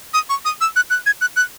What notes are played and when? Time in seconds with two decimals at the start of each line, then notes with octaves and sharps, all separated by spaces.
0.14 D#6
0.29 C#6
0.45 D#6
0.61 E6
0.76 F#6
0.90 F#6
1.06 G#6
1.21 F#6
1.36 F#6